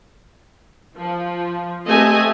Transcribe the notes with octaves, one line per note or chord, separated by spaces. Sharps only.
F3
A3 C4 G4 D#5 G#5